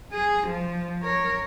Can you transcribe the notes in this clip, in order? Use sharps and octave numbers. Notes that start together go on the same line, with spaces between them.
G#4
F3
A#4 C#5